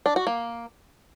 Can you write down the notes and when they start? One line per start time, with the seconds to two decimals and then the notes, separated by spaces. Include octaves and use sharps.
0.06 D4
0.16 F#4
0.27 A#3